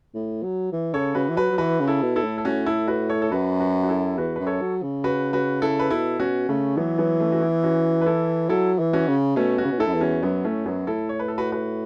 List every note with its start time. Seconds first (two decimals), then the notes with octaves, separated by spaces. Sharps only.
0.14 A2
0.43 F#3
0.72 E3
0.93 C#3 A4 C#5
1.15 C#3 F#4 B4
1.29 E3
1.37 F#3 F#4 B4
1.52 F#3
1.58 E3 F#4 B4
1.80 C#3
1.88 E4 A4
2.02 B2
2.16 E4 A4
2.23 A2
2.38 A4
2.45 C#4 F#4
2.66 E4 A4
2.88 F#4 B4
3.09 A4 C#5
3.22 A4
3.31 F#2 F#4 B4
3.60 F#4 B4
3.84 F#4
3.89 E4 A4
4.18 E2 F#4 B4
4.36 F#2 B4
4.47 A4 C#5
4.61 F#3
4.82 C#3
5.04 F#4 B4
5.33 F#4 B4
5.62 E4 A4
5.79 B4
5.90 B2 E4 A4
6.19 B2 C#4 F#4
6.48 C#3 A3 C#4
6.77 E3 F#3 B3
6.98 F#3 B3
7.20 A3 C#4
7.32 F#4
7.41 B3 E4
7.64 C#4 F#4
8.01 B4
8.06 E4 A4
8.49 F#3 E4 A4
8.79 E3
8.93 C#4 F#4
9.08 C#3
9.36 B2 A3 C#4
9.58 C#4 F#4
9.65 C#3
9.72 B2
9.79 A2 E4 A4
9.86 F#2
9.94 E2
10.01 C#4 F#4
10.23 F#2 F#3 B3
10.45 A2 A3 C#4
10.66 F#2 F#3 B3
10.87 A2 E4 A4
11.09 C#5
11.19 B4
11.28 A4
11.38 F#4 B4
11.52 F#4 B4